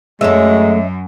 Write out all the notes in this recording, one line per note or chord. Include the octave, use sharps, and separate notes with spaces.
F#2 G#3 A3 C#4 A4 D#5 E5